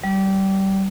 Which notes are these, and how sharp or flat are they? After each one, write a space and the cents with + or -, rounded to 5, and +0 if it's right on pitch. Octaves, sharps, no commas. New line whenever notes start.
G3 -25